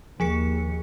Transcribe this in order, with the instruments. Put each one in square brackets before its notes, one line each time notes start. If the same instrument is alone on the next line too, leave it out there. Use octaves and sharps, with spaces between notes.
[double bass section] D#2 [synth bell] F3 G#4 C#7